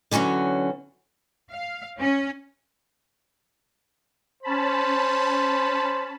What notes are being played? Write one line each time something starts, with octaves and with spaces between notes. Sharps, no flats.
D3 E3 F#3 C#4 F#4
F5
C#4
C#4 C5 A5 B5